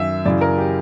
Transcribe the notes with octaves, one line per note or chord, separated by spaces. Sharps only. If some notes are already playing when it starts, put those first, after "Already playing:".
Already playing: F#2 D#3 E5
F#2 C#3 E3 D5
A#4
G4